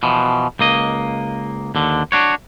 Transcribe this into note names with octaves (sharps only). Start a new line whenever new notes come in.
B2 E3 F3
C#2 A#3 D#5
D#2 D3
D4 F#4 C#5